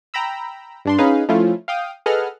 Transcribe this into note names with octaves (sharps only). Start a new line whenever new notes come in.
G5 A#5 B5 E6
G2 D4 C6
C#4 D#4 G#4 B4 F5
F3 A3 C#4 E4 F4
F5 G5 D#6
G#4 A4 B4 D#5 F#5 F6